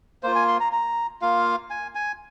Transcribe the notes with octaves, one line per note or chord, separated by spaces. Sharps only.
A#3 F4 C5
G#5
C6
A#5
A#5
A#3 F4 F5
G#5
G#5